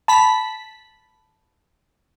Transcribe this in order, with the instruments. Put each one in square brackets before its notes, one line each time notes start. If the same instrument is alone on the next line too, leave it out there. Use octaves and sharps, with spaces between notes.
[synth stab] A5 B5 B6